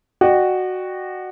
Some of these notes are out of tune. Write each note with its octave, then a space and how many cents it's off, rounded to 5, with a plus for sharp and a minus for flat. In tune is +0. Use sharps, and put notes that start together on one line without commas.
F#4 +0 D5 +45 G5 +0